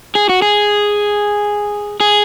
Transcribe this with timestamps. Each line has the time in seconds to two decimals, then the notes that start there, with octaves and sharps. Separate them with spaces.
0.15 G#4
0.29 F#4
0.42 G#4
2.00 G#4